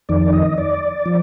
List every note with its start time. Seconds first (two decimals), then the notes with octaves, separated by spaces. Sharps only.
0.09 F2 D#3 D5
0.33 D#5
0.58 D5
1.05 F3